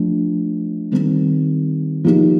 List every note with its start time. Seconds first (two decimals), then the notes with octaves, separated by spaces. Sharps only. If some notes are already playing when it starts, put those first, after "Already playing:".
Already playing: F3 A3 D4
0.92 D#3 G3 C4
2.04 F3 A#3 D#4 G4